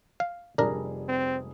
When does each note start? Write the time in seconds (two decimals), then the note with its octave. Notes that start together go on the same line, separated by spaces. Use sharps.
0.20 F5
0.58 F1 G3 D4 G#4 A#4
1.09 C4